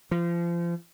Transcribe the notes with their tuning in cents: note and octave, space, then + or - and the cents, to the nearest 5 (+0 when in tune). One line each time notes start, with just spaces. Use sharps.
F3 -30